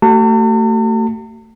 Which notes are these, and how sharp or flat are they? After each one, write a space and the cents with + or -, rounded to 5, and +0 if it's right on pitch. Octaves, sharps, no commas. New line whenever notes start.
A3 +25 F#4 +45 A5 +45